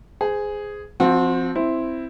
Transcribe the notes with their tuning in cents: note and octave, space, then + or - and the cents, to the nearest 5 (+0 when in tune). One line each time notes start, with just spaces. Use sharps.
G#4 +0 C5 -35
F3 +0 C4 +0 F#4 -35
C4 +0 E4 +0